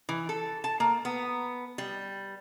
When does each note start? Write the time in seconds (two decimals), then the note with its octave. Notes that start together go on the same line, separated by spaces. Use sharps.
0.09 E3
0.29 A4
0.64 A5
0.80 A#3
1.05 B3
1.78 G3